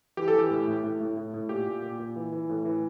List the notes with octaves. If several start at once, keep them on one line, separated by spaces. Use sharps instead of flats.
E3 G4
A4
E3 G4
A2
A2
A2
A2
A2
A2
A#2 G4
A#2
A#2
A#2
E3
E3
A2
E3